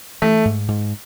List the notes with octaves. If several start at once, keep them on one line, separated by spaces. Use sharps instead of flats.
E3 A3
G#2
G#2